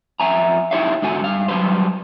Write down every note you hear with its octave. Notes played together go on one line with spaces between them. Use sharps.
F2 E5 G#5 A#5
D#4 E4 G4 C#5 E5 F5
G#2 D3 F#4 G#5
G2 F5
F#3 G3 B4 C5